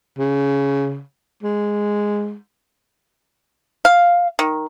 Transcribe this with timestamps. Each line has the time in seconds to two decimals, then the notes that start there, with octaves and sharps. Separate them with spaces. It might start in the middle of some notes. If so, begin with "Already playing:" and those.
0.19 C#3
1.43 G#3
3.85 F5
4.39 D#3